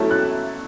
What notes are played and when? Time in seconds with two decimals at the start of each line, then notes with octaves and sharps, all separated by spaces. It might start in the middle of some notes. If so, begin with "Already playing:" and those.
Already playing: F#3 A3 C#4 E4 A5
0.11 F#6